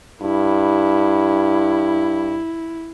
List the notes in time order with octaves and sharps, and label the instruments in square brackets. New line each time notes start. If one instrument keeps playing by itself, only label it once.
[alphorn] G2 [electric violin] E4